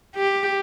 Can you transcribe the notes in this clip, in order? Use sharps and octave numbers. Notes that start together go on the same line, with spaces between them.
G4